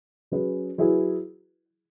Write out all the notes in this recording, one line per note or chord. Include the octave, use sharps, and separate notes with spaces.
F#3 C#4 G#4 B4
F#3 E4 G#4 B4